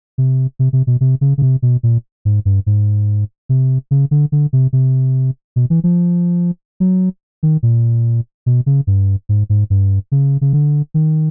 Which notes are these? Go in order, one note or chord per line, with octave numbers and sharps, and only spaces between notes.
C3
C3
C3
B2
C3
C#3
C#3
C3
B2
A#2
G#2
G2
G#2
C3
C#3
D3
D3
C3
C3
B2
E3
F3
F#3
D#3
A#2
B2
C#3
G2
G#2
G#2
G2
C#3
C#3
D3
D#3